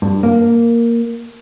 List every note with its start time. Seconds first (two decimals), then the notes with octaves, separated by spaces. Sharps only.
0.02 G2
0.23 A#3